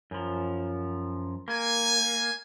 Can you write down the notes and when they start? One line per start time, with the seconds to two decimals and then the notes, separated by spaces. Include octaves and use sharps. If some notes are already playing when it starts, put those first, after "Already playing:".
0.11 F#2 F3
1.48 A#3 G#5